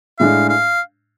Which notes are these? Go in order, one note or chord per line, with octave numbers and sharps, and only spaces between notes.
A2 G#3 D4 F5
F5